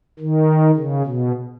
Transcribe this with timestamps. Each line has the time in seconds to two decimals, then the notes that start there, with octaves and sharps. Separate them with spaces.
0.19 D#3
0.77 C#3
1.06 B2